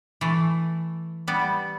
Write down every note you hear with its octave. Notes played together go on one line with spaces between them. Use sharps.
E3 A3
G3 B3